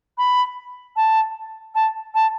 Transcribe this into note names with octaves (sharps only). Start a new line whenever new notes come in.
B5
A5
A5
A5